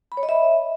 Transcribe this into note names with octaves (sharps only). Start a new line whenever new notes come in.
B5
C#5
D#5
E5